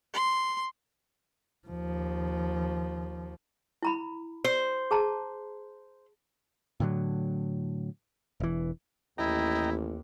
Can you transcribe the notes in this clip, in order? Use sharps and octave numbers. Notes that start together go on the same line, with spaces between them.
C6
D#2 F3
E4 A#5 B5
C5
G#4 A5 A#5
A2 D3 F#3
E1 E3
A1 D#2 E4 D#5 G5 A#5